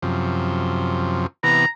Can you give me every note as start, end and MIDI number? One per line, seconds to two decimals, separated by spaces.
0.02 1.27 42
0.02 1.27 48
0.02 1.27 53
1.43 1.66 48
1.43 1.66 52
1.43 1.66 59
1.43 1.67 82